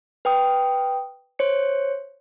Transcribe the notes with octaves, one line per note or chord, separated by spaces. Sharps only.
B4 G5 D#6
C5 C#5 C#7